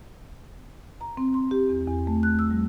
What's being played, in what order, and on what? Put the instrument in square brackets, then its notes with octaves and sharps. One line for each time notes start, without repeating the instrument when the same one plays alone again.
[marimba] A#5
C4
C6
G4
E2
E2
A3
F#6
E6
G3